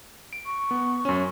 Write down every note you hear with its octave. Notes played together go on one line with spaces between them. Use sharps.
D7
C#6
B3
F#2 C#4